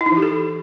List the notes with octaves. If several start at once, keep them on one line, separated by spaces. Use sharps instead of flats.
E4
D#4
E3
G4
A4